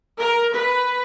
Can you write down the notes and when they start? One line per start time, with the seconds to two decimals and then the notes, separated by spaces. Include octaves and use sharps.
0.18 A#4
0.54 B4